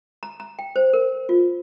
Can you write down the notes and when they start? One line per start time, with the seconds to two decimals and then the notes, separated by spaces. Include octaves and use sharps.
0.23 A#5
0.40 A#5
0.59 G5
0.76 C5
0.93 A#4
1.29 F4